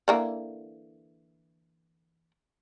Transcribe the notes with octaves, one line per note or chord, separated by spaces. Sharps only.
D3 E3 A#3